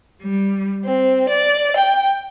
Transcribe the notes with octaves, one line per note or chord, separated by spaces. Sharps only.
G3
C4
D5
G5